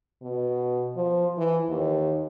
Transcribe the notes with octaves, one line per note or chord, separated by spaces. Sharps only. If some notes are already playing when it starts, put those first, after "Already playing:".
B2
F3
E3
D#2